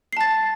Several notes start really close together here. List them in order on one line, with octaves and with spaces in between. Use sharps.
C7 A5 A6